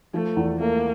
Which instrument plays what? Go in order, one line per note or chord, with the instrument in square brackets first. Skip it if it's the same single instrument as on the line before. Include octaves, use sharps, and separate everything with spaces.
[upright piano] F3 [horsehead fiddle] A3
[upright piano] E2
[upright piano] A3 [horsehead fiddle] A#3